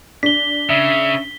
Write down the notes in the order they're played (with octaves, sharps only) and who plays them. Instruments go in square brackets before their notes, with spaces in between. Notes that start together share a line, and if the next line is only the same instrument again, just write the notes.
[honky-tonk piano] D4 [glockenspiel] B6 G7
[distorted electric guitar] C#3 [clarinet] E5